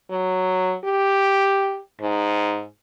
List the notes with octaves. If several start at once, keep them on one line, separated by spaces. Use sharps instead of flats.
F#3
G4
G#2